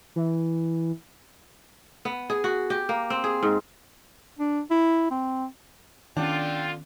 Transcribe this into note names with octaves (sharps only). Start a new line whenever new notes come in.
E3
B3
G#4
F#4
G4
A#3
C4
G#4
G#2
D4
E4
C4
D3 D#3 B3 C#4 D4 F4 G5